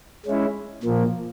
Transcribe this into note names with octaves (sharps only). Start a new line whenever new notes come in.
G#3 C#4 E4
A#2 F3 A#3